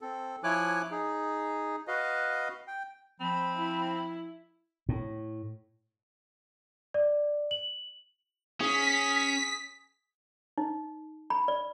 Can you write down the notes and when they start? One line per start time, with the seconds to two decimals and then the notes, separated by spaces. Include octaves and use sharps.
0.01 C4 A4
0.44 F3 E4 C#5 G#5 D6 F#6
0.91 D#4 G#4
1.88 F#4 B4 D#5 F5
2.67 G5
3.20 F3 C4 B5
3.55 E4
4.89 A2
6.94 D5
7.51 F#7
8.61 C#4 G#4 B6
10.58 D#4
11.30 B5
11.48 D5